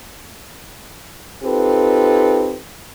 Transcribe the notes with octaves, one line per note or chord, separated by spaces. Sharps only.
C4 D#4 F4 G4 A4 B4